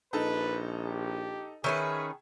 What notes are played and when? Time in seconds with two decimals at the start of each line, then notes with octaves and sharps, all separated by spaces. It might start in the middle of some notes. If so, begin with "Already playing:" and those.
0.13 A#1 D#4 A4 B4
0.86 G4
1.64 D#3 C#4 G#4 B4 E5 C#6